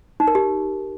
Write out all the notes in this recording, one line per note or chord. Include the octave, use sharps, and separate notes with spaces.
D#4
A#4
G4